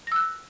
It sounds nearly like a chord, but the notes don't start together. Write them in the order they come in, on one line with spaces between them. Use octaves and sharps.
A#6 E6 F#6